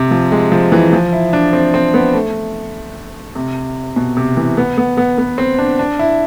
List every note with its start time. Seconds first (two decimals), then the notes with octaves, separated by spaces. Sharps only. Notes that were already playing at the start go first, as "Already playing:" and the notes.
Already playing: C3
0.11 F3
0.32 G#3
0.52 F3
0.72 E3
0.93 F3
1.13 E4
1.33 D4
1.53 C4
1.74 C4
1.94 B3
2.13 A3
3.35 C3
3.96 B2
4.17 C3
4.37 E3
4.57 B3
4.78 B3
4.97 B3
5.18 B3
5.38 C4
5.58 D4
5.79 D4
5.99 E4